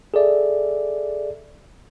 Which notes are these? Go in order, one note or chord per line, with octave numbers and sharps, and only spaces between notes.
G#4 A4 D5 E5